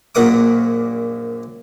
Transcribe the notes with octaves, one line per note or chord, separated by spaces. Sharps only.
A#1 F#2 A#2 F#5 D6 D#6